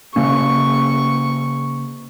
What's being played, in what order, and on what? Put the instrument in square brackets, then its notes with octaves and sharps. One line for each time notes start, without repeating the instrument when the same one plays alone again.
[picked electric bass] C#3 A#3 C#4 [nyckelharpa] C#6